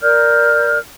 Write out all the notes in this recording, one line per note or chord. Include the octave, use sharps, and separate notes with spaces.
A#4 D5 F6 G6